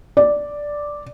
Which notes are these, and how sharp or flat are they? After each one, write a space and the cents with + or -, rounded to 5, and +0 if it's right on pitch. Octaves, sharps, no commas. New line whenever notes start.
D5 +0